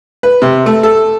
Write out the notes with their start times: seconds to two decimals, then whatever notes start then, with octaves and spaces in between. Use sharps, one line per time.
0.23 B4
0.42 C3
0.66 A3
0.83 A4